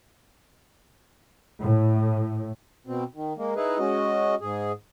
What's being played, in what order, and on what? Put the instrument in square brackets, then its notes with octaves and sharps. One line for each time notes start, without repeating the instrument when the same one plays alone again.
[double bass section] A2
[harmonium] B2 C4
D#3
G#3 A#3
D#4 E4 G#4 B4
G#3 C#4 F#4 D#5
G#2 G#4